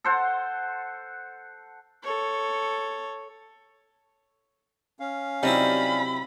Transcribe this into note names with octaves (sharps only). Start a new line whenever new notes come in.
A4 C5 F#5
A4 C#5
C#4 F5
C3 F#3 G3 D#4 E4 B5